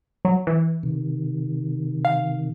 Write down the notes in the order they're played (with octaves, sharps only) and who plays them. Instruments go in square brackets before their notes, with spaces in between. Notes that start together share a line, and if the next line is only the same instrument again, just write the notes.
[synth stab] F#3
E3
[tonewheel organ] C3 D#3
[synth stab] F5